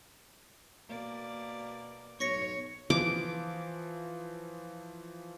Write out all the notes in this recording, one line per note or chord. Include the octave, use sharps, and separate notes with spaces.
B2 A#3 D5
B1 C#5 C#6 A#6 C#7
E3 F3 D6